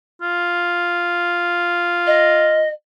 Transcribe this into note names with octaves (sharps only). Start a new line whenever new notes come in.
F4
D#5